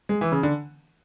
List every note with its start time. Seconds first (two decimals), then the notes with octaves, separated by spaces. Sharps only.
0.09 G#3
0.21 E3
0.32 C#3
0.43 D3